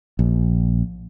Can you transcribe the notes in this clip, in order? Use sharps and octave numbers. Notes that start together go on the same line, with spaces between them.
A#1